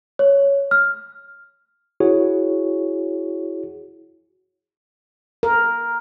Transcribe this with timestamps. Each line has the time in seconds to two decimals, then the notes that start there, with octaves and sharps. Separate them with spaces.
0.19 C#5
0.71 F6
2.00 E4 F#4 G#4 C#5
5.43 A#4